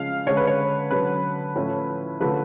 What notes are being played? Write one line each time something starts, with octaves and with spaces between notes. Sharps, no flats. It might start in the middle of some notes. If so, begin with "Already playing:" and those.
Already playing: C#3 F3 G#3 C#4 F5
D3 G#3 C#4 C#5
B4
C#5
D3 F#3 C#4 B4
A2 F3 A3 C#4
D3 F3 A3 C#4 B4